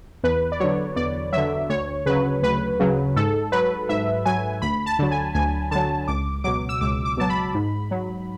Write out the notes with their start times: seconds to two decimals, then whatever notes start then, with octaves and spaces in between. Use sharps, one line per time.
0.24 E2 B4
0.52 D5
0.60 D3 F#3 C#5
0.96 E2 D5
1.33 D3 F#3 E5
1.69 D2 C#5
2.06 C#3 F#3 B4
2.43 D2 B4
2.80 C#3 F#3
3.16 G#2 A4
3.52 F#3 B4
3.89 G#2 E5
4.26 F#3 G#5
4.62 D2 B5
4.86 A5
4.99 D3 F#3
5.11 G#5
5.35 D2 G#5
5.71 D3 F#3 A5
6.08 C#2 D6
6.44 B2 F#3 D6
6.69 E6
6.81 C#2 D6
7.05 D6
7.17 B2 F#3 A5
7.30 B5
7.55 G#2
7.91 F#3